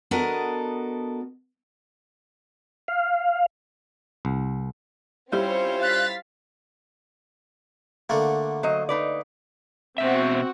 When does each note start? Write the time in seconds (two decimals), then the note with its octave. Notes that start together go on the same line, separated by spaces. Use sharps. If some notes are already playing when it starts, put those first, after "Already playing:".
0.11 B3 D4 F#4 A4 A#4 D#5
2.88 F5
4.25 C2
5.32 G3 C4 C#4 E4 F4 C5 C#5
5.82 F5 F#6 A6 B6
8.10 D3 A3 A#3 F#5
8.63 F#3 C5 D#5
8.89 D#4 B4 D5
9.98 B2 C4 F#4 E5